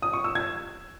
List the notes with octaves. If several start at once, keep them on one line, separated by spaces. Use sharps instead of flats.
D#6
C#6
E6
G#6